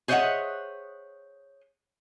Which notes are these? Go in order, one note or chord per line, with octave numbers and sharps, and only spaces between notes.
G#4 C5 C#5 D#5 E5 F#5